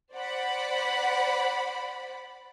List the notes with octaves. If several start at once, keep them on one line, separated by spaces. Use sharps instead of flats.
C5 D5 F#5 B5